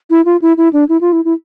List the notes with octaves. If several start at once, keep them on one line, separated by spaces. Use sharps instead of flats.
E4
F4
E4
E4
D4
E4
F4
E4
E4